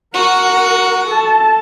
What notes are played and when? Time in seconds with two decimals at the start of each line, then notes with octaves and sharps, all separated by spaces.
0.14 F#4 A#4 F#5
1.07 A4 A5